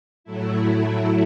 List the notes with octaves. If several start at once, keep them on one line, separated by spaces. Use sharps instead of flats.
A2 F#3 A3 E4